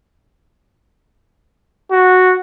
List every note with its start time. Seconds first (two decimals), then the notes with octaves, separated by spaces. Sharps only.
1.92 F#4